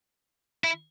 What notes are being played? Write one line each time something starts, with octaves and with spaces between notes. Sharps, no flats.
E4